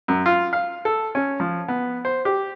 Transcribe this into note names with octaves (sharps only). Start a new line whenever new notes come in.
F#2
F4
F5
A4
C#4
F3
B3
C5
G4